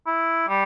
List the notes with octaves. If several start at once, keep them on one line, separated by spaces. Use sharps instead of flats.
E4
G3